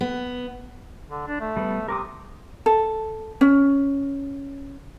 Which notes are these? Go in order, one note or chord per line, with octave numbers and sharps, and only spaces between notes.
B3
D3
D4
A3
G3 B3
C3 A#4 D6 D#6
A4
C#4